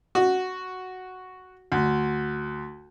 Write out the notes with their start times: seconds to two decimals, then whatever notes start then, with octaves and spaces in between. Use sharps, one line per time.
0.15 F#4
1.72 D2